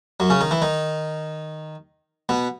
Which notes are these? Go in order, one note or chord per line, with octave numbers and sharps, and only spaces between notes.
F#2 F#3
C#3 C#4
D#3 D#4
E3 E4
D#3 D#4
B2 B3